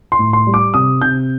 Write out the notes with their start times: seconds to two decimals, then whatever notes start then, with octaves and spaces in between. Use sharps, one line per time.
0.12 C6
0.19 A2
0.33 C6
0.47 G3
0.54 D6
0.74 C3 D#6
1.02 C3 G6